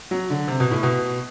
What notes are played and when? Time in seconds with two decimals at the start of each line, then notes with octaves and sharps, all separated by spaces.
0.11 F#3
0.30 D3
0.48 C3
0.60 B2
0.71 A2
0.83 B2